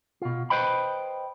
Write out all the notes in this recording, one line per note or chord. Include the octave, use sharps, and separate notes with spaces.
B2 F4
B4 C5 D#5 G5 B5